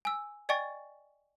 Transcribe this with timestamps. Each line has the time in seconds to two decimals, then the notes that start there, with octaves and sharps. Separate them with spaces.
0.05 G#5 E6
0.49 D5 D#5 G5 G#5 C#6 A6